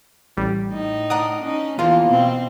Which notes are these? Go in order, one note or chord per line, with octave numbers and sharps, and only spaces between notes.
A1 G3
A2 D#4
D4 A#4 F#5 D#6
C#4 D#4
E2 E3 F3 A#3 F4
B2 C4